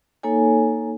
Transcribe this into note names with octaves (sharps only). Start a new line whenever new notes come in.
A#3 D#4 A4 C#5 G#5